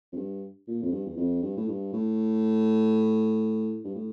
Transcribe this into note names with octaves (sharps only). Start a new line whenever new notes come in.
F2
G2
A#2
F2
G2
E2
F2
G2
A2
G2
A2
G2
A2